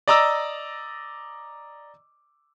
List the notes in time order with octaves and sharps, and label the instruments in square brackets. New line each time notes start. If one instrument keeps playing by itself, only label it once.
[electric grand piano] D5 D#5 A#5 D6 E6